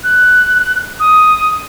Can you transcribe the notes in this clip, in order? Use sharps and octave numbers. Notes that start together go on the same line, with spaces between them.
F#6
D#6